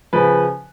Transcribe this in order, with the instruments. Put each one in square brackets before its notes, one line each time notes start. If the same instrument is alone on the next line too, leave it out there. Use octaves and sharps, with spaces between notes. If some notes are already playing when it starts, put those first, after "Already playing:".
[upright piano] C#3 F3 B4